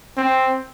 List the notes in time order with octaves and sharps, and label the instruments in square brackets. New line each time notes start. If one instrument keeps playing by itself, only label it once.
[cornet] C4